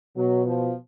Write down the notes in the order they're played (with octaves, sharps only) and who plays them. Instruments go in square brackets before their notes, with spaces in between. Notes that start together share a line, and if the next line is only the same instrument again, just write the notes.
[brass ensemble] B2 F#3
F3